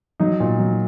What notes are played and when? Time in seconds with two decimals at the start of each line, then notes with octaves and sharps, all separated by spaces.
0.20 F#3 D#4
0.40 A#2
0.60 F#3